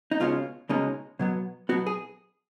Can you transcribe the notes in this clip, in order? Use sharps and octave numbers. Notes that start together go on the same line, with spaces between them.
D#4
C#2 B2 G#3 C#4 F4
C#2 B2 G#3 C#4 D#4
B2 F#3 B3
B2 F#3 B3 F#4
G#4